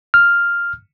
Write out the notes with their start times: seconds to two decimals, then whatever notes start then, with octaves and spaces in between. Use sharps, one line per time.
0.14 F6